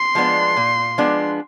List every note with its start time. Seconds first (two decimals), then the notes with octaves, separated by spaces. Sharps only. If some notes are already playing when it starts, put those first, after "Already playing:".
Already playing: C6
0.15 F3 G#3 B3 D4
0.57 A#2
0.98 F3 G#3 B3 D4